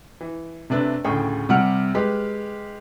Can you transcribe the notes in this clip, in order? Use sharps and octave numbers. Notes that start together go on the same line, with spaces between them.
E3
C3 A3 D4 B4
D2 A2 C#3 G#4 G5 C#6
C3 G3 F#5 F6
G#3 G4 B4